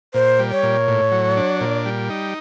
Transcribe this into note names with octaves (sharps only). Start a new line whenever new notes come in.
A#2 C5
G3
C#5
A#2
A2
F#3
D4
A#2
G3
D#4